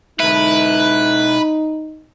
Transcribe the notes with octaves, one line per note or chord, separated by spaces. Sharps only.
B1 D#4 E4 B4